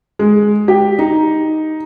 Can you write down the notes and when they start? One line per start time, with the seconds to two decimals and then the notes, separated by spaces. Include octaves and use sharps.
0.19 G#3
0.68 G4
0.99 D#4